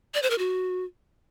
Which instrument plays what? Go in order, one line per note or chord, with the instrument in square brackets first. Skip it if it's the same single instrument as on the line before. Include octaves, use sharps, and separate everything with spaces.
[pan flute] D5
C5
A#4
F#4